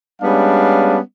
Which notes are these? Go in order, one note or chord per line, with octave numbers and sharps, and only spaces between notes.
G3 G#3 B3 C#4 D4 F5